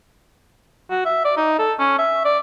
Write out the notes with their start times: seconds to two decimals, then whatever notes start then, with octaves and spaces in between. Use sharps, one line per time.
0.90 F#4
1.05 E5
1.25 D5
1.37 D#4
1.59 A4
1.79 C#4
1.98 E5
2.25 D5